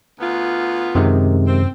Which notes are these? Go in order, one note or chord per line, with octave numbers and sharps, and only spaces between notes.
D2 B3 F4
F#2 C3 D#3 G#3
C4